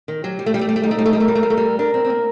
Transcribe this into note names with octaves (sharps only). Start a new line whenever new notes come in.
D#3
F#3 G4
G3
A3
G3 G4
A3
G3
A3
G3 D#4
A3
G3
A3
G3
A3 A#4
G3
A3
G3
A3
G3
D4 A#4
C4
C4
A#3